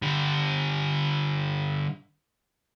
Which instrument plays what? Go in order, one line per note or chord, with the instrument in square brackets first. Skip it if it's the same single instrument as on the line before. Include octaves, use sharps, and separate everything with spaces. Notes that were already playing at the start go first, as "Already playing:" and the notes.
[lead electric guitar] D3 G3